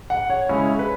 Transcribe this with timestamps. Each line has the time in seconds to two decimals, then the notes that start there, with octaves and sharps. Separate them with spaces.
0.10 F#5
0.30 C#5
0.49 C#3 G#3 C#4 E4 C#5
0.79 B4